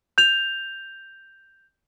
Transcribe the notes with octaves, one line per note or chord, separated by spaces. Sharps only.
G6 F7